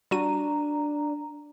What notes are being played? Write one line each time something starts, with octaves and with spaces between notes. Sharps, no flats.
G3 D4 F#4 A#5 D#7